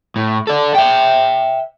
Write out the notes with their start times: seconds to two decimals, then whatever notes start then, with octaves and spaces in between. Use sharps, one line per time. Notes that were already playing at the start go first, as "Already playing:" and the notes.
0.16 A2
0.47 A4 D5
0.75 E5 G5